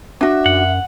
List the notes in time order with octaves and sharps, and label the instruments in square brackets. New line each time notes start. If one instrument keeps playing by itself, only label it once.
[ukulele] D4 F#4 [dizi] E5
[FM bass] F#2 [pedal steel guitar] F#5